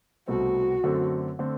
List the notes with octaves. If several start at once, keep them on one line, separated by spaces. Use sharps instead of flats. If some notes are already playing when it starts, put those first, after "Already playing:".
C2 B2 A3 C4 F#4
F#2 D3 A3 C4
D3 A3 C4